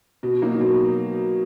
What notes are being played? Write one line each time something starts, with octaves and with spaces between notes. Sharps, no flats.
B2
F#3 A#3 D#4
B2